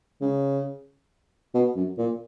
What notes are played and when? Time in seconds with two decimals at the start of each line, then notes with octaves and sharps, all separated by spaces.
0.21 C#3
1.55 B2
1.76 F#2
1.99 A#2